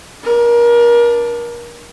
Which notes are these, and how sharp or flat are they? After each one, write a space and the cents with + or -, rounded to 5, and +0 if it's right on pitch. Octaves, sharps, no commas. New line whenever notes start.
D4 +0 A#4 +30